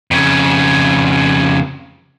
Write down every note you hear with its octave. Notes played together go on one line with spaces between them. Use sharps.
F2 C#3